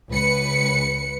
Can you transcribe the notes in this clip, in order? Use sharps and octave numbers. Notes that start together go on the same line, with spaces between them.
C#2 B4 C#7